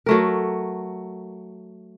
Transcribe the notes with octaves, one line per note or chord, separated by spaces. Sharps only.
F#3 A3 A#4